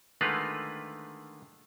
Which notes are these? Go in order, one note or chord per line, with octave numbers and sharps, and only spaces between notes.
D3 D#3 G#3 A3 F4 B4